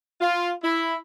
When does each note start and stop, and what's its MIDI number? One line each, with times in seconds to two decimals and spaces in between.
0.21 0.51 65
0.63 0.95 64